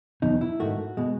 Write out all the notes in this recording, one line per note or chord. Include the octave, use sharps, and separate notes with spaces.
E2 B2 F#3 D#4
E4
G#2 D#3 A3 F#4
B2 G#3